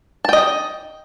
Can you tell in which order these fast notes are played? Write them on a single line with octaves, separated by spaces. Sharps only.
A5 G5 D#5